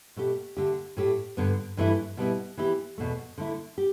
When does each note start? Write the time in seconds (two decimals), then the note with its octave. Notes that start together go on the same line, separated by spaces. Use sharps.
0.16 B2 A3 G4
0.57 D3 A3 G4
0.97 A2 A3 G4
1.37 G2 D3 B3
1.77 G2 E3 A3 E4
2.17 B2 G3 B3 E4
2.57 E3 B3 E4 G4
2.98 E2 B2 A3
3.38 D3 A3 E4
3.78 G4